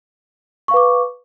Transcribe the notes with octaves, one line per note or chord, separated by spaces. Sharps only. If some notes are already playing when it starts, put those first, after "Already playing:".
B4 F5 C#6 D6